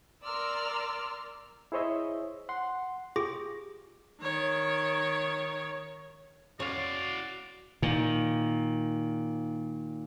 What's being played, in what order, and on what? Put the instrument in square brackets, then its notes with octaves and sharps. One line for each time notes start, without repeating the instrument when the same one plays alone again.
[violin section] A#4 D5 A#5 C6 E6 F6
[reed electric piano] E4 G#4 C5 C#5 D#5 E5
F#5 C6
[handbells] F4 G4 G#4 C#6 D6 A#6
[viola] D#3 C#5
[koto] C#4 C#5 [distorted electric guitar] F#4 F5 [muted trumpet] D5
[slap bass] A#2 D#3